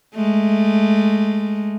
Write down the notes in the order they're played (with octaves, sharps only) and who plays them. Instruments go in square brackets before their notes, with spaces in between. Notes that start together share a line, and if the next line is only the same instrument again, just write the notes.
[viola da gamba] G#3 A3